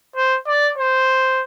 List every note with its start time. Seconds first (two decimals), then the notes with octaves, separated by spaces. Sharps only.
0.16 C5
0.47 D5
0.78 C5